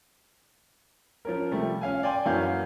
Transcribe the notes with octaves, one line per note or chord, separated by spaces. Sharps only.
F3 C#4 A#4
C3 F3 G3 A3
C#4 F5 G#5
D5 G5 G#5 C6
F#2 E3 A#3 F#4 F5 G6